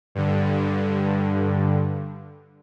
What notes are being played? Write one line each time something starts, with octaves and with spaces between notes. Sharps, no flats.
G2 D3